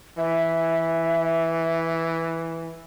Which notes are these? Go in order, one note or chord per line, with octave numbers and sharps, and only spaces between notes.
E3 E5